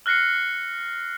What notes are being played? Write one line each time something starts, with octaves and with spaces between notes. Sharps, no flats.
F6 F#6 A#6 C7 C#7